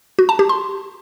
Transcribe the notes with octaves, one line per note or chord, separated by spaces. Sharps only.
F#4
A5
G4
C6